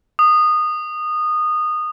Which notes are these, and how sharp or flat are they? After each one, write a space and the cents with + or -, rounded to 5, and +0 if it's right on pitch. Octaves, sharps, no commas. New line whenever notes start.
D#6 -20